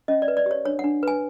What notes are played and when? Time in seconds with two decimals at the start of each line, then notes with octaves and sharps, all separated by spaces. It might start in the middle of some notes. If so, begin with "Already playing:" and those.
0.08 C#4 D#5
0.22 D5
0.28 B4
0.37 D5
0.46 G4 C#5
0.65 D4 C#5
0.79 F#5
0.84 D4
1.03 B4 G#5